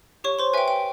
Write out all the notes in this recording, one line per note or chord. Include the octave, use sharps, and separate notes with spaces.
G4 C#5 C#6
C5 C6
B4 E5 G5 G#5
G5